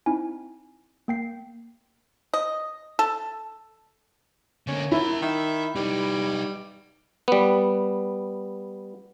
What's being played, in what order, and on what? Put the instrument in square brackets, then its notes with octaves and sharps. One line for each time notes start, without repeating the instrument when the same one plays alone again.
[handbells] C4 D#4 E4 G#5
A#3 G5 C7
[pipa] D#5
A4
[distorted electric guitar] D3 A#3 [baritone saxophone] C#4
[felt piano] E4 [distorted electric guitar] A#4 E5
[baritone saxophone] D#3 [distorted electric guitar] E5
[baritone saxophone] G3 [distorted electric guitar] D#4 B4
[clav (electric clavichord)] G3 B3